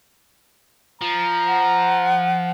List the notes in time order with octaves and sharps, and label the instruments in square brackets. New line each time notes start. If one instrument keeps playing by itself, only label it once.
[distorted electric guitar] F3 [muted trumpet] A#5
[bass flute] F#5